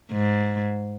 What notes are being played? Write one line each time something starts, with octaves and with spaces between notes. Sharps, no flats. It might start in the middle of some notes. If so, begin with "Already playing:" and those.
G#2